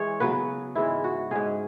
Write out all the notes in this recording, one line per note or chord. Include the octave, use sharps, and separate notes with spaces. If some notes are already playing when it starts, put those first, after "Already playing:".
Already playing: E3 G#3 G#4 C#5
C#3 F#3 B3 B4
G#2 E3 G#3 C#4 E4
F#4
G#2 G#3 C#4 G#4